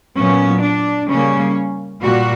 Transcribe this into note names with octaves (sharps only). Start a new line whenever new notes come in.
A#2 F#3 B3 C#4
D4
C#3 G3 A#3 C#4
A#2 G3 F#4